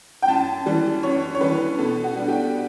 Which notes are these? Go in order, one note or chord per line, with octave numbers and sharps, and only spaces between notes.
G5
F#2 A5
E3 G3
F#2 C#5
C#5
E3 G3 B4
B2 A4
F#4
G3 D4
G4